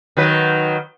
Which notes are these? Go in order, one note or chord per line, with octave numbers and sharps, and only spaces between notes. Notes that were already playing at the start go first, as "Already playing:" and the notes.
D#3 F#3 B4